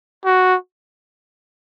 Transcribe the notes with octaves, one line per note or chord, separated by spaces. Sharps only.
F#4